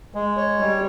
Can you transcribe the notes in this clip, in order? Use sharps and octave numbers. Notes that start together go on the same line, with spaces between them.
G#3
C#5
G3